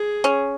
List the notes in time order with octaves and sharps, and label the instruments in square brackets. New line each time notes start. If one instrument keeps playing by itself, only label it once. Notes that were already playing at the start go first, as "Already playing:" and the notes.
Already playing: [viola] G#4
[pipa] C#4